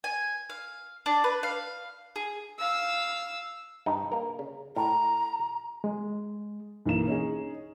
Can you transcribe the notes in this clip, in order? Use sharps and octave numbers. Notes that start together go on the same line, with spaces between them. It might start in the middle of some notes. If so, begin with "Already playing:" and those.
G#5
F5
D4
B4
F5
G#4
F5 E6
G2 D#4
A#3 A#4
C#3
A2 A#5
G#3
B1 E3 A#3 E7
C#4 D#4 G#4